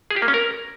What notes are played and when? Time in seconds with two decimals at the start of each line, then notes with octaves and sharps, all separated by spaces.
0.11 G#4
0.16 G4
0.22 A#3
0.28 C#4
0.34 A#4